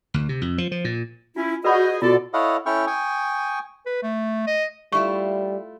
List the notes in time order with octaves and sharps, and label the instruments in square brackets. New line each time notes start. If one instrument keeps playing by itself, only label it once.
[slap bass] D2
C3
F2
F3
F3
A#2
[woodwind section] C#4 E4 [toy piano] F4
[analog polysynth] F#4 G6 [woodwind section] G#4 D#5 [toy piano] B4 D5 B5
[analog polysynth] B2 [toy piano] F4 F#4 [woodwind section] A4 D5
[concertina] E4 A4 C#5 D#5 F5 F#5
C#4 E4 A4 G5 C#6 F6
G5 G#5 C#6 D#6
[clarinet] B4
A3
D#5
[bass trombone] G3 [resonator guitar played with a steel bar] A3 E4 F4 [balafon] C#6